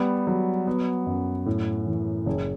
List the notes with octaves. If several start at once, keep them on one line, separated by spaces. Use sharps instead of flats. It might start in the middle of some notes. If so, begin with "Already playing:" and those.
Already playing: G3 B3
F#3
B3
F#2
A2
E3
F#1